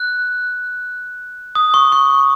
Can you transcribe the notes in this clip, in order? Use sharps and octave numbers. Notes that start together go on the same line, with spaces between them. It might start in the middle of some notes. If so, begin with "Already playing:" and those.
Already playing: F#6
D#6
C#6
C#6